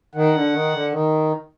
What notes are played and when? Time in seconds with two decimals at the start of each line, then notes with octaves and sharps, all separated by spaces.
0.15 D#3 F#5
0.34 D3
0.53 D#3
0.73 D3
0.92 D#3